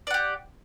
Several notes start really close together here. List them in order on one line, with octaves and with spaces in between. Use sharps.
D5 F#5 G4